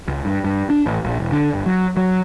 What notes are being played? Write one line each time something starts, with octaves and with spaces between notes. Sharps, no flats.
C#2
G2
G2
D4
A1
A#1
E1
D3
G1
F#3
F#3